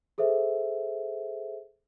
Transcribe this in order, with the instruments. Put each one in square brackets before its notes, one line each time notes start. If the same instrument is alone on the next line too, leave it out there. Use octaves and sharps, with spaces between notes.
[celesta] G#4 A4 C5 E5